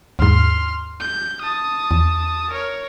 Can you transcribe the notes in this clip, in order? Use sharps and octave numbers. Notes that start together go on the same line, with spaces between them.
D#2 G#2 C6 F6
G6
A5 D#6
E2
A#4 C#5